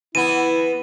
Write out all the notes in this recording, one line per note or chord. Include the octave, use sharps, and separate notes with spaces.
E3 B3 E4 D#7